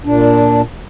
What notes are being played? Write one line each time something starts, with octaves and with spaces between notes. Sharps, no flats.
A#2 D4